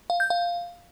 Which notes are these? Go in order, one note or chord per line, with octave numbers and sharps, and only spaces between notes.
F5
G6
F5